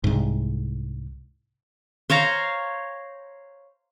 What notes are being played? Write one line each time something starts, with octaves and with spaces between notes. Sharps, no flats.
C2 G#2
C5 C#5 F5 A#5